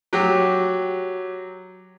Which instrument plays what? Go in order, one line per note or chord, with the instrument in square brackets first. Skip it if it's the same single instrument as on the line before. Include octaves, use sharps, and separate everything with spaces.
[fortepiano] F#3 G4